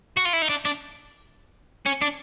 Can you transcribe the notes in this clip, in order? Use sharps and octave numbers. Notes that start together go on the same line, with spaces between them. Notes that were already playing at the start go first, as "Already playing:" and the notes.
F#4
F4
E4
D#4
D4
D4
C#4
D4